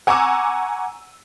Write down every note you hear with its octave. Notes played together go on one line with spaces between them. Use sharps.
F#5 G#5 A#5 C#6 D6 E6